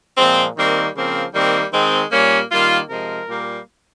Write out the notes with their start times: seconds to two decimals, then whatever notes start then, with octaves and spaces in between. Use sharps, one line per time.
0.17 A#2 F3 G#3 C4
0.57 D#3 G3 A#3 C4
0.96 C#3 F3 A#3 C4
1.34 D#3 G3 A#3 C4
1.73 D#3 G#3 C4
2.12 A#2 G3 A#3 C#4
2.51 D#3 G3 A#3 F4
2.89 C3 F3 G#3 A#4
3.29 A#2 G3 A#3